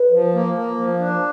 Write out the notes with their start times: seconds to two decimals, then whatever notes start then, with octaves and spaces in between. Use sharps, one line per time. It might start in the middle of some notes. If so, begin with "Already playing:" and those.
Already playing: B4
0.11 F3
0.34 A#3
0.55 A#3
0.77 F3
0.99 D4